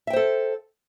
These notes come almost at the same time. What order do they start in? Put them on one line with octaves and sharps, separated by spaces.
E5 G5 C5 A4